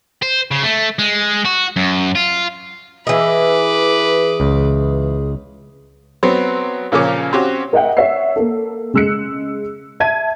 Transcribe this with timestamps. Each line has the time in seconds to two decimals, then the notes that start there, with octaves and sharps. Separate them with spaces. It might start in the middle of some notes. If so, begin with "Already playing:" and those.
0.23 C5
0.51 C#3
0.63 A3
0.99 G#3
1.45 F#4
1.76 F#2
2.16 F4
3.07 E3 G#4 B4 D#5 D6
4.40 C#2
6.23 F#3 B3 C4
6.92 A#2 C#3 F3 A#3 C#4 D6
7.33 C4 C#4 F#4 G4
7.73 A#4 D#5 E5 F#5 G5
7.97 C#5 E5 F#5 E6 C7
8.36 A#3 A4
8.93 C#3 G#3 E6 F#6 C#7
10.00 E5 A5 G#6 D#7